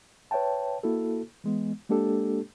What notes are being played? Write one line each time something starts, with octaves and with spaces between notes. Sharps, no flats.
B4 C#5 E5 G5 A5
A#3 E4 F#4 A4
E3 G#3 B3
G#3 A#3 D4 G4 A4